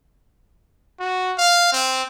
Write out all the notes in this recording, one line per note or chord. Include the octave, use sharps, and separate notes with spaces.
F#4
F5
C4